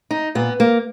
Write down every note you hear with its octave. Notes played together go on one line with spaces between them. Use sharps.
D#4
A#2 B3
A#3